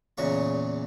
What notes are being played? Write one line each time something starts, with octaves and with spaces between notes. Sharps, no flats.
E2 A#2 C#3 C#6